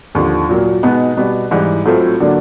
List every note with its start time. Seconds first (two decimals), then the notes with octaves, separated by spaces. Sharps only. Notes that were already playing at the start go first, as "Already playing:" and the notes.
0.15 D#2 D3 F3
0.49 A#2 F#3 A#3
0.83 B2 G#3 B3 D#4
1.17 B2 G3 B3
1.51 G#2 E3 G3
1.86 A2 F#3 A3 C4 F4
2.20 D3 F#3 A#3 D4